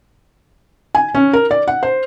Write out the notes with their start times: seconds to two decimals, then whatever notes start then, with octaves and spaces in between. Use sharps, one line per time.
0.95 G#5
1.15 C#4
1.33 A#4
1.51 D5
1.68 F#5
1.83 C5